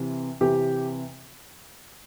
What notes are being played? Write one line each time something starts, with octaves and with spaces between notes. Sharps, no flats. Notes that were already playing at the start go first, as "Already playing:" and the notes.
Already playing: C3 E3
C3 E3 G4